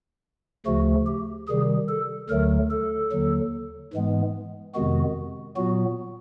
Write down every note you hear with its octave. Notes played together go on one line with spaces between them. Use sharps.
D2 C#3 F3 A3 F#4
G4
C3 D#3 G3 G#4
A4
D2 D3 F#3 A3 A#4
A4
D#2 D3 F#3
G#2 E3 G#3 B3
F2 C3 D#3 G#3 B3 F#4
A#2 F#3 B3 F#4